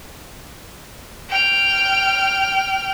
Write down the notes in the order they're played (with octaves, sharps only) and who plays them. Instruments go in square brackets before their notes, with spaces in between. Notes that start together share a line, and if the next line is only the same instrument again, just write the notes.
[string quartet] G5 F6